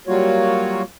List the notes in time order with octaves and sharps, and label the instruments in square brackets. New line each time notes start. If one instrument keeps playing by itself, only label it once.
[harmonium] F#3 G3 A#3 F4 F#4 C#5